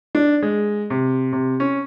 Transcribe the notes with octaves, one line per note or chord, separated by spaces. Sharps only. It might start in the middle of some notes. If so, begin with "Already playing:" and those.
D4
G#3
C3
C3
C#4